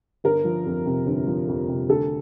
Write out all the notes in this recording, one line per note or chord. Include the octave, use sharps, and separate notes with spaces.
G1 A#4
F3
F2
C3
G1
F3
F2
C3
D2 A4